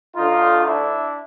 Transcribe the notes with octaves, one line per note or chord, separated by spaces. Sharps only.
D2 D3 D#4 F4
D4 E4